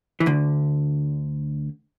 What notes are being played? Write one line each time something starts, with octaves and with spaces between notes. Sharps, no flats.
E3
D2 D3